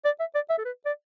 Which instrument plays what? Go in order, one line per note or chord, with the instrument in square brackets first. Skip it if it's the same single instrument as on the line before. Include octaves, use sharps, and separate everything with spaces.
[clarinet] D5
E5
D5
E5
A4
B4
D5